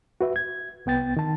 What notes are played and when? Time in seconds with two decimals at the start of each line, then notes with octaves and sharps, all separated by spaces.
0.21 F#4 B4 E5
0.36 G#6
0.86 C2 B3 G5 A6
1.16 D#3 A5